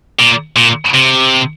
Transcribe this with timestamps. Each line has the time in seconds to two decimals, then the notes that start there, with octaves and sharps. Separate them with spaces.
0.20 A#2
0.56 A#2
0.93 C3